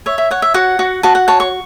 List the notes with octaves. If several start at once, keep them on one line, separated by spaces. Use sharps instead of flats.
C#5 E5
E5
C#5 F#5
E5
F#4 F#5
F#4
F#4 A5
F#5
C#5 A5
C#6